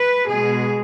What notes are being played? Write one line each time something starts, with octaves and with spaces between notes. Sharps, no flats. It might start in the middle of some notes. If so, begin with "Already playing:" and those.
Already playing: B4
B2 G#3 G#4